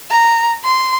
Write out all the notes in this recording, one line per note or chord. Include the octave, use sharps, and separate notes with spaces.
A#5
C6